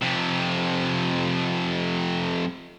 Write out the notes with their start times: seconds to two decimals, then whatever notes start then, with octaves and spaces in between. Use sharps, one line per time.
0.02 F2 C3